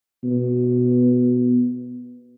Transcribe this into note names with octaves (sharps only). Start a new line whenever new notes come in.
B2